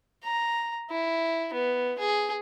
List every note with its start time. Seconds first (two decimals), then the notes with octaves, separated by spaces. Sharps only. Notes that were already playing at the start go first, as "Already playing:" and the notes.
0.24 A#5
0.90 E4
1.53 B3
1.99 G#4